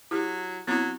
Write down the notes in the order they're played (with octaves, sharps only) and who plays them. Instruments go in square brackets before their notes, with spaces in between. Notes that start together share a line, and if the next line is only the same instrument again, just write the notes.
[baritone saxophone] F#3 [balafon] E4 G4
[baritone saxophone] F#3 [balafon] B3 C4 E4